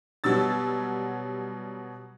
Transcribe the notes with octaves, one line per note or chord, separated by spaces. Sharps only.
B2 F#3 G3 E6 A6